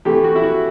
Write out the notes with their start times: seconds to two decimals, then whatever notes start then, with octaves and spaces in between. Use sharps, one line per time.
0.05 C3 E3 A3 G4
0.24 F#4
0.35 E4
0.43 F#4